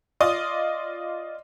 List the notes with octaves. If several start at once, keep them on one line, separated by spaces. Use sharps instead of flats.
F4 D5 D#5 D#6